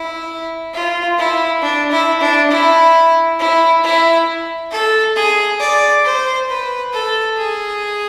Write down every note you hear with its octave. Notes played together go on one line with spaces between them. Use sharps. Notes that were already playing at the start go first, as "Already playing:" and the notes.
Already playing: E4
F4
E4
D4
E4
D4
E4
E4
E4
A4
G#4
D5
C5
B4
A4
G#4